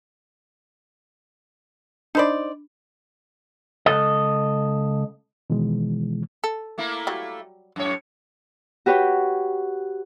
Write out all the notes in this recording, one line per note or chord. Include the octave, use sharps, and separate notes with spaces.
D4 D#4 C5 D5 B5
C#2 C#3 A4 D#5
B2 D#3 E3 G#3
A4
A3 A#3 E4
F#3 G3
F#2 A2 C#5
F#4 G4 B4 C#5 G5